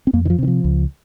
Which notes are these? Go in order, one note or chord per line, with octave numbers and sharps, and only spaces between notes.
C4
F2 A#3
D#3
F3
C3 D#3
F3
C#2